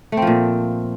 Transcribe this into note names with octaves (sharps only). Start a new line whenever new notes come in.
A#2 F3 A3 C4